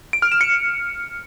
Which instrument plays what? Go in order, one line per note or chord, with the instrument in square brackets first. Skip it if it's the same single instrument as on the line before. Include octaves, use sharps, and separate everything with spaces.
[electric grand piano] D7
F6
E7
C#7